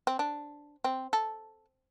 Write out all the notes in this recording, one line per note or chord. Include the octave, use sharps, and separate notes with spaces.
C4
D4
C4
A4